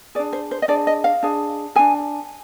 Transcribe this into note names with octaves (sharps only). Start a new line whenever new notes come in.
D4 G#4 D5
C5
C5
D#5
D4 G#4 D5
D#5
F5
D4 G#4
D4 G#4 G#5